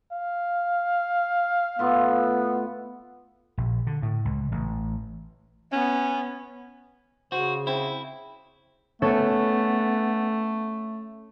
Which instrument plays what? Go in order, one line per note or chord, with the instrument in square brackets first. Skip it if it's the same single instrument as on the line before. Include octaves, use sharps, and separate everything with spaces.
[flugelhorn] F5
[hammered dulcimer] A2 F4 [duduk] B3
[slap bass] A#1
D3
A2
C#2
A1
[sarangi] B3 [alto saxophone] C#4
[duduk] C#3 [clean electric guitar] F#4 [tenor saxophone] C5
[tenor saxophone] C4 [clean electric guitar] E4
[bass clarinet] A3 [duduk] B3 [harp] C#4 A4 C#5